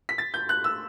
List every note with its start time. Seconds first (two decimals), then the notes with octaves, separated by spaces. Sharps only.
0.09 B6
0.18 A6
0.34 G6
0.49 F#6
0.64 E6